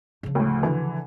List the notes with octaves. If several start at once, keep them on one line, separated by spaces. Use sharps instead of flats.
C#3 F3
D2 A2
D3 E3